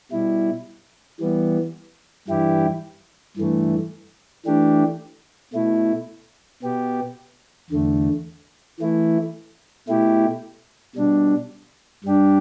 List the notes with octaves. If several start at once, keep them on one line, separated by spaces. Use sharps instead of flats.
B2 G3 E4
E3 G3 B3
G2 E3 G3 E4 G4
G2 E3 A3
E3 A3 D4 G4
B2 A3 E4
B2 B3 G4
E2 D3 A3
E3 A3 E4
B2 A3 E4 G4
B2 G3 D4
G2 G3 D4 G4